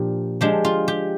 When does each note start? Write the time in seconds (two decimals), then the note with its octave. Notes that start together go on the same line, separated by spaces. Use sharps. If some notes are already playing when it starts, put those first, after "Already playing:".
Already playing: A#2 F3 D4 G4
0.41 F3 G#3 D4 G4
0.65 F4
0.88 G4